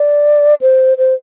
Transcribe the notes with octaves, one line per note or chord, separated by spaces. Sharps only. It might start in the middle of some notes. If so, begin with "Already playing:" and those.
Already playing: D5
C5
C5